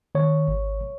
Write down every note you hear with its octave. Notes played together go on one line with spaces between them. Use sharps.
D#3 C#5
G#1